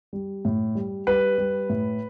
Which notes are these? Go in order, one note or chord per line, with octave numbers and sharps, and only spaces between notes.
G3
A2
G3
G3 B4
G3
A2